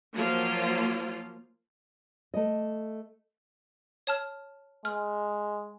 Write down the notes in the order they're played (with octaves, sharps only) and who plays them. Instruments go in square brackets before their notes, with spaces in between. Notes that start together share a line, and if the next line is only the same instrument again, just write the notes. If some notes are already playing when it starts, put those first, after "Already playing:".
[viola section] F3 F#3 A#3 F4
[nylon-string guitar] A3 D#5
[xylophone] C#5 A5 F6
[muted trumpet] G#3 [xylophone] F6